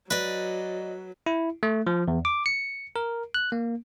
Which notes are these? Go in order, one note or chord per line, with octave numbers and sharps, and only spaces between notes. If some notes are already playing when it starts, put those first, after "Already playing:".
F#3 B4 D5 D#5
E4
A3
F3
E2
D6
C#7
A#4
F#6
A#3